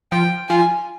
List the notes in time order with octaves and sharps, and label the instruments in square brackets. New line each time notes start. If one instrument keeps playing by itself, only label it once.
[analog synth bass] F3 [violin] G5
[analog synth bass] F3 [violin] G#5